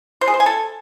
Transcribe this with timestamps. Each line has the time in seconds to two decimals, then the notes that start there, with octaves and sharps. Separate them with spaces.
0.21 C5
0.28 G#4
0.34 C5
0.40 G#5
0.46 A4